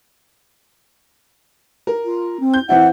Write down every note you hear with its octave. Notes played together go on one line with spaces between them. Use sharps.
A#4
F4
C4
G6
E3 C4 E4 F#5